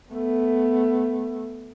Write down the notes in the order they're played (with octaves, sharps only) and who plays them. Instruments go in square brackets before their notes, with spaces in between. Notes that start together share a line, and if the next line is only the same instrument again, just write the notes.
[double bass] A3 B3